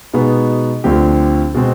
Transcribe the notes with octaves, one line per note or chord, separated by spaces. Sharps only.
B2 G#3 B3 D#4 G#4
D2 D3 F3 C4 G4
B2 G#3 C4